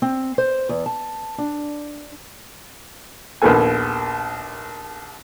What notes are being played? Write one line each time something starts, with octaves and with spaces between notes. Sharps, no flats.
C4
C5
E2
A5
D4
A#1 D#2 A#3 B3 A4 G#5